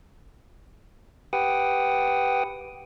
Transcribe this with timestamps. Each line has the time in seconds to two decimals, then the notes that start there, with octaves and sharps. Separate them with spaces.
1.33 G4 B4 F#5 G5 D#6